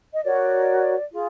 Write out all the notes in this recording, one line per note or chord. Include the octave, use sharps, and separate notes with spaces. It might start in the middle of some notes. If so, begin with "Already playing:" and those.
D#5
F#4 A#4 C#5 D5
F4 G#4